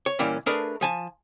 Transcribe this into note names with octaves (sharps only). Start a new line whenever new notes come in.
C#5
A#2 E3 G3 A#3 C#4
A3 D4 G#4 A#4 B4
F3 G#5 A5